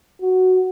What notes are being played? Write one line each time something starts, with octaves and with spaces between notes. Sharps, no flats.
F#4